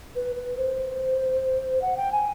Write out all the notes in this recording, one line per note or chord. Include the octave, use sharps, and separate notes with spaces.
B4
B4
C5
F#5
G5
G#5